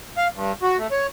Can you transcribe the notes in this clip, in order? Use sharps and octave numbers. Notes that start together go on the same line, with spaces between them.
F5
G2
F#4
A3
C#5